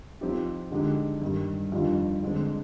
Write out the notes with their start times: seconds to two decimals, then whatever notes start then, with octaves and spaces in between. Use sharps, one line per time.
0.21 F3 C4 D#4 G4
0.71 D3 G#3 D#4 G4
1.22 G2 D#3 G3
1.72 F2 D#3 G3 D4 F4
2.23 D3 G#3 C4